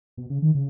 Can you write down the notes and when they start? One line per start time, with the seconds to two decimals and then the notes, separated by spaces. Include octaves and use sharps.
0.17 B2
0.30 C#3
0.42 D#3
0.55 C#3